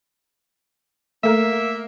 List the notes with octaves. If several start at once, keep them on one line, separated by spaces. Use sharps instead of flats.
A3 A#3 A4 E5 A#5